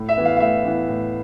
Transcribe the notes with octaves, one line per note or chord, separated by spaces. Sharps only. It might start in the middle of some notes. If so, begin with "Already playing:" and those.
Already playing: A2
E5
E3 B3
F5
F5
A2 E5
E3 B3
A2